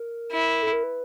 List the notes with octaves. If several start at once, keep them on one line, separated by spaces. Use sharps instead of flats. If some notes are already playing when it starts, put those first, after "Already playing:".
Already playing: A#4
E4
A4
A#4
B4